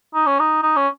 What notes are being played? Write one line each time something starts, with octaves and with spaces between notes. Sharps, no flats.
D#4
C#4
D#4
D#4
C#4